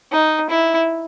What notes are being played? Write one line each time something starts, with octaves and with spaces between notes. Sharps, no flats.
D#4
E4